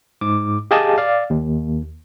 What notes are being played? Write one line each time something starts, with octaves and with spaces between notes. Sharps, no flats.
G#2 D6
G4 G#4 D#5 F5 G#5 A5
D5 F5
D#2